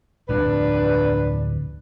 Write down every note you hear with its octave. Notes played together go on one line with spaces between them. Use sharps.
D1 F2 D4 B4 D5